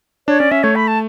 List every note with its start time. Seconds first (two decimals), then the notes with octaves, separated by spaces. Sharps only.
0.28 D4 C#5
0.39 C#4 D5
0.51 C#4 E5
0.63 A3 C#5
0.76 B5
0.88 A5